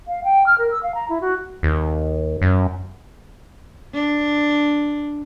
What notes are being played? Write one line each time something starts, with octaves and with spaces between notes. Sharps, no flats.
F5
G5
F6
A#4
E6
F5
A#5
E4
F#4
D#2
F#2
D4